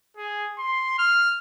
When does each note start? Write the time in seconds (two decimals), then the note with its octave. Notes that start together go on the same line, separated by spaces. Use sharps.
0.17 G#4
0.58 C6
0.99 F6